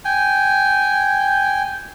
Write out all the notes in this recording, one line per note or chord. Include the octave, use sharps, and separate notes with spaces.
G5 G#5